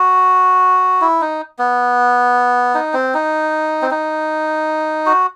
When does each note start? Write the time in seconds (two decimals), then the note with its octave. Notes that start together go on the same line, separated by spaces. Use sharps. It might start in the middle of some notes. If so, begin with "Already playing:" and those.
Already playing: F#4
1.01 E4
1.21 D#4
1.59 B3
2.75 D#4
2.94 C4
3.14 D#4
3.82 C4
3.91 D#4
5.06 F#4